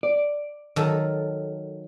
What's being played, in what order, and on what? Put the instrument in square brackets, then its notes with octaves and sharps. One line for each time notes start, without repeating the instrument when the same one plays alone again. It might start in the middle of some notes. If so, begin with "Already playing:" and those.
[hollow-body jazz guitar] D5
[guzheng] D#3 F#3 A4